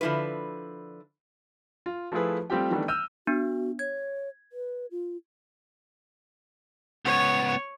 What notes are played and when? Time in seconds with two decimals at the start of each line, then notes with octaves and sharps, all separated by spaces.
0.01 D3 F3 A#3 E4 B4
1.86 F4
2.12 F3 A3 E4 F4 G#4 B4
2.50 G3 A3 C4 F4 G4 G5
2.71 D#3 E3 G3 A3 B3 D4
2.88 E6 F6 G6 D#7
3.27 B3 D4 F#4
3.79 C#5 G#6
4.52 B4
4.91 F4
7.05 C#2 B3 C#5